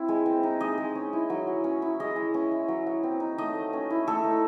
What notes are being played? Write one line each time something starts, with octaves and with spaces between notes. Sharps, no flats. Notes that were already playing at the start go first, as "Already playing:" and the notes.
Already playing: C4 E4
G#3
C4
D#4
G#3 D#5
G#3
C#4
E4
F#3
F#3
C#4
E4
G#3 D#5
G#3
C#4
E4
F#3
F#3
C4
D#4
A3 D#5
A3
C#4
E4
A3 A4
D#4